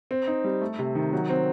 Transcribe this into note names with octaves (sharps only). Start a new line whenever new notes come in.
C4
D#4
G3
A3
C3
D#3
F#3
C4